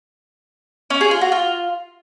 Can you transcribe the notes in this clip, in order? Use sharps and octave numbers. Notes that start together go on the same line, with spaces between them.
C#4
G#4
F4
F#4
F4